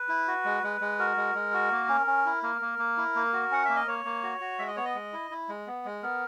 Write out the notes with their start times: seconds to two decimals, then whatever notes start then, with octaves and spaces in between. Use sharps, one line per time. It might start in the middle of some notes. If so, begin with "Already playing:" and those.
Already playing: B4
0.09 E4
0.28 F#4
0.45 G#3
0.63 G#3
0.81 G#3
0.99 F#4 A#4
1.17 G#3
1.35 G#3
1.53 F#4
1.71 A#3
1.89 C#4
2.07 C#4
2.26 E4
2.43 A#3 A#4
2.62 A#3
2.79 A#3
2.97 E4
3.16 A#3
3.33 F#4
3.51 C#4 F#5
3.65 A#3 E5
3.76 D#5
3.87 A#3 C#5
4.05 A#3
4.23 F#4
4.41 F#4
4.59 G#3 E5
4.68 D#5
4.76 B3 C#5
4.85 D#5
4.95 G#3
5.13 E4
5.31 E4
5.49 G#3
5.67 B3
5.85 G#3
6.03 B3 A#4